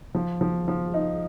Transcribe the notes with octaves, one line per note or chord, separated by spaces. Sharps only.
F3
F3
F3
D#4